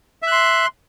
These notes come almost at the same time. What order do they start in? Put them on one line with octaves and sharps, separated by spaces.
E5 F#6 C6